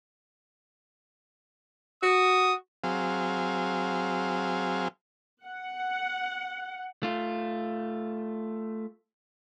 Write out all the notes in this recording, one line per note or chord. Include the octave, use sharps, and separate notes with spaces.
F#4 D#6
F#3 C4 G#4 F5
F#5
A3 F4